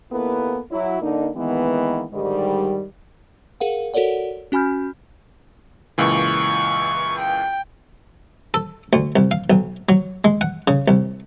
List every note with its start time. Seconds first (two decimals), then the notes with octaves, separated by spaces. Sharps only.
0.11 D#2 A#3 B3 E4 A4 B4
0.71 F#3 E4
1.01 D3 A#3 D4 D#4
1.35 D#3 E3 G#3 A#3 B3
2.11 G#2 D3 D#3 G3
3.60 G#4 A#4 F5 F#5
3.94 F#4 A4 A#4 C#5 D5 F#5
4.52 C#4 F#4 G#5 B5 F6 G6
5.98 C#2 A#2 E3 C#6
7.18 G5
8.54 A4
8.93 D2
9.16 C2
9.31 F5
9.50 B1
9.89 F#3
10.24 G#3
10.41 F#5
10.68 C#3
10.88 C2